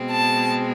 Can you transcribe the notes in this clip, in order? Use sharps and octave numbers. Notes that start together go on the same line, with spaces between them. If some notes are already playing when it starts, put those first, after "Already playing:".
Already playing: B2 G#3 C4
A5